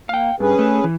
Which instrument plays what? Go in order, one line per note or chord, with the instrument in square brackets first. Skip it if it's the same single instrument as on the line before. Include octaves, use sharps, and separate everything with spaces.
[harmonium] A#3 [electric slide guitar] F5 G5
[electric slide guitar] G2 [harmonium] C#4 G#4 B4
[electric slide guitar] A3
E3